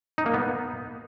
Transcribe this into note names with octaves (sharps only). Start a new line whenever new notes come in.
D#4
A#3
B3